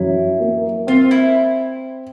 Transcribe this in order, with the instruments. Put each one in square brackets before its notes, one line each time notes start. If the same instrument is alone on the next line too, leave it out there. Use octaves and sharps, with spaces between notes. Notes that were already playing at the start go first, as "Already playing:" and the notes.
Already playing: [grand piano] F#2 [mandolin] E4
[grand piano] A#3
[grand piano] C4 [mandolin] F4
[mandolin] E4